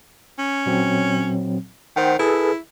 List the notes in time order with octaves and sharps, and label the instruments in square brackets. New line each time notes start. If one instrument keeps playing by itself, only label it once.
[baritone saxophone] C#4
[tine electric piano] A#2 F#3 C4
[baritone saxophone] D#3 [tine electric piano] C5 F#5 G5
[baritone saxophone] E4 [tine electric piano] G#4 A4 B4